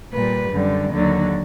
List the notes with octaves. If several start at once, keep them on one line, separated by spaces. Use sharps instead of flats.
A#2 G3 B4
F#2 D3 G3
D#2 D3 F#3